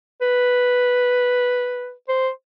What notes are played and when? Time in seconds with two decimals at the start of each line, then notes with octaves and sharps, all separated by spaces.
0.21 B4
2.09 C5